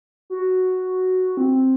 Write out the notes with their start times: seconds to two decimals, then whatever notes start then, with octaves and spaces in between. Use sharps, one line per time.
0.30 F#4
1.37 C4